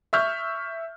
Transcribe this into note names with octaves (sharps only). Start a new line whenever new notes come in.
E5 C#6 F6 G6